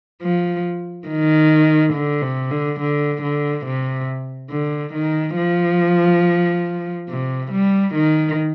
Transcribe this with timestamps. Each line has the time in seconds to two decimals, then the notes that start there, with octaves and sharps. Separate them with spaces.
0.22 F3
1.08 D#3
1.94 D3
2.22 C3
2.51 D3
2.80 D3
3.22 D3
3.66 C3
4.51 D3
4.94 D#3
5.37 F3
7.09 C3
7.52 G3
7.95 D#3